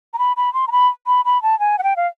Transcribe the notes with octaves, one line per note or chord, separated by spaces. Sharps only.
A#5
B5
B5
C6
A#5
B5
B5
B5
A5
G#5
F#5
G5
F5